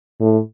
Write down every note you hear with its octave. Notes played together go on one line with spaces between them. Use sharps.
A2